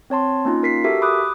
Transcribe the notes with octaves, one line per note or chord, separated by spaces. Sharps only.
C4 C#5 A5 C6
A#3 C#4 D#4 F4
A#4 B6 C7
F#4 G4 A4 A#4 E5
B5 D6 D#6 F#6